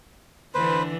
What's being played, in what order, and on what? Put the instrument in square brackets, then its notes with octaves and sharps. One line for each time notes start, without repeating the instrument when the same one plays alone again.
[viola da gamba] D3 E3 D4 [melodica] B4 C5